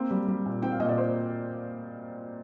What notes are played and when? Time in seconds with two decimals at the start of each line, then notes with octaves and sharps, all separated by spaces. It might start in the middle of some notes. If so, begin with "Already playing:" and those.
Already playing: A#3 C4
0.11 G3
0.28 G3
0.46 A#2
0.62 C4 G5
0.72 F5
0.80 A#2 D#5
0.89 D5
0.98 C5